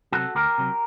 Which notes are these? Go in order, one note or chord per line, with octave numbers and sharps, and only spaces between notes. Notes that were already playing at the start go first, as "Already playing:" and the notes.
C3 F#3 F#4 A4
D2 G4 A#4
C3 F#3